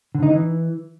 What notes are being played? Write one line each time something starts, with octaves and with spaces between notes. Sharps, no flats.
D3
D#4
E3